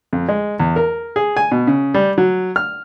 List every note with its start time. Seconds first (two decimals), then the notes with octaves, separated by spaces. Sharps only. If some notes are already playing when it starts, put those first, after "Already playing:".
0.13 F2
0.29 G#3
0.60 E2
0.76 A#4
1.16 G#4
1.37 G#5
1.52 B2
1.67 C#3
1.94 G3
2.18 F#3
2.56 F6